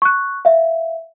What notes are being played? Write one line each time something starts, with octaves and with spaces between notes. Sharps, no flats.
C#6 F#6
E5 F5